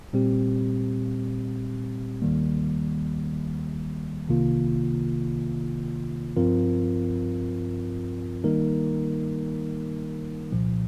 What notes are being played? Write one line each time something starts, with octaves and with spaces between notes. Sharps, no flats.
A#2 G3 C4 G4
D#2 D#3 G3 A#3
C2 C3 D#3 A#3 F4
G2 F3 C4 F4 A#4
D#3 G3 A#3 D#4 A#4
C2 A#2 F3